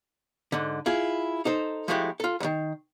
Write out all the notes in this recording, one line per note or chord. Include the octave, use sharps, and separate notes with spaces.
G#2 D3
E4 F4 G#4
D#4 A4 C5
F3 G#3 A3 E4 F#4 G4
F4 A4
D#2 D#3